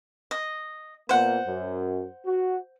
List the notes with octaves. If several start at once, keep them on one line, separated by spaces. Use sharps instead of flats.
D#5
A#2 A#3 B3 C5 F#5
F#2
F#4